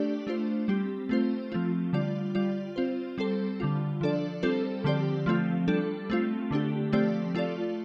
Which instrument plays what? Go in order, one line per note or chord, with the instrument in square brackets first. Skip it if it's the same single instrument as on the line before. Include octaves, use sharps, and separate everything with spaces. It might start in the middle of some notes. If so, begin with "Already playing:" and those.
Already playing: [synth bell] A3 D4 G4 D5
A3 D4 F4 C5
G3 C4 G4
A3 C4 F4 C5
F3 A3 C4 F4
D3 G3 F4 D5
G3 F4 D5
C4 F4 C5
G3 C4 A4 C5
D3 G3 F4
F3 D4 A4 D5
G3 C4 F4 A4 C5
D3 F3 C4 G4 D5
F3 A3 C4 F4
G3 D4 A4
A3 C4 F4
D3 A3 D4 G4
F3 A3 C4 G4 D5
A3 F4 A4 D5